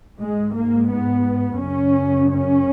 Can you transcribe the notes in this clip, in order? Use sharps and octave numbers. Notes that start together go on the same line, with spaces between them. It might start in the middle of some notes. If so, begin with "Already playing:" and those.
G#2 G#3
A#3
B3
F#2 C#3 C#4
C#4